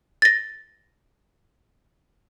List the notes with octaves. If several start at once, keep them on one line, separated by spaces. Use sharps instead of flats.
A6 A#6